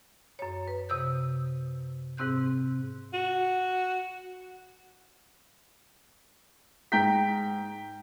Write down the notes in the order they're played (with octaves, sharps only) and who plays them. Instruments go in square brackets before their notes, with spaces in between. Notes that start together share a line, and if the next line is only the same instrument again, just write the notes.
[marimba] F#2 C#5
B4
C3 D#6 E6 G6
G#2 C3 C4 F#6 G6
[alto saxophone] F#4
[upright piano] G#2 G5 A#5 G6 B6